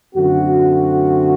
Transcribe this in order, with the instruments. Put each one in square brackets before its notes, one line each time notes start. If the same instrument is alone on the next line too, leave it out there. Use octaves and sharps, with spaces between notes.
[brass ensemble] F#2 D3 A3 C4 F#4